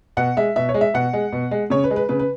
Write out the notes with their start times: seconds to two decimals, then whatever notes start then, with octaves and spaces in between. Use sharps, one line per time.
0.17 B2 F#5
0.37 G#3 E5
0.56 B2 E5
0.69 C#5
0.74 G#3
0.81 E5
0.94 B2 F#5
1.13 G#3
1.32 B2
1.51 G#3
1.70 C#3 C#5
1.84 B4
1.90 G#3
1.96 B4
2.09 C#3 B4
2.19 B4